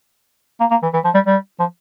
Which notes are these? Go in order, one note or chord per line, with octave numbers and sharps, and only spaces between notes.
A#3
A#3
E3
E3
F3
G3
G3
F3